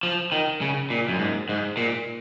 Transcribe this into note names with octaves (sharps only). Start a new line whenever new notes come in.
F3
D#3
C#3
A#2
F#2
G#2
G#2
A#2